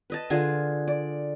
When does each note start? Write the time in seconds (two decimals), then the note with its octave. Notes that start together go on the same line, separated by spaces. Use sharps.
0.10 B4 D#5 A5
0.30 D3 F4 G#4 G#5
0.88 D5